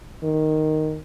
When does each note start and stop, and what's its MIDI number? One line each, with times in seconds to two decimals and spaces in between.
0.23 0.99 51